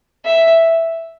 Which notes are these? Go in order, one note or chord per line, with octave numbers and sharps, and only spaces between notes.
E5